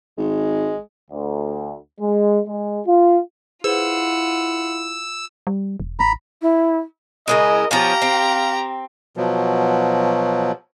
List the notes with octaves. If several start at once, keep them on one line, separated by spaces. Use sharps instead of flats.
G#1 G#3
D2
G#3
G#3
F4
E4 F4 G#4 B4 C5 F#5 E6
G3
E1
A1 A#5 B5
E4
C#3 G#3 E4 A#4 D#5
F3 B3 C#4 G4 F5 A#5
C4
B2 F3 F#3